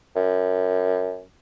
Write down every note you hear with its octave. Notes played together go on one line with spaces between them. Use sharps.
F#2